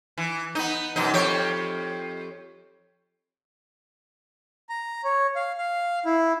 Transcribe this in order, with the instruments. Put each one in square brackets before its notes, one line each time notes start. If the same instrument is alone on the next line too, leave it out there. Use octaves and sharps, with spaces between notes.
[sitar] E3
B3 D#4
F#2 B2 D#4
F2 G4 C#5
[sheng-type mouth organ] A#5
C#5
F5
F5
E4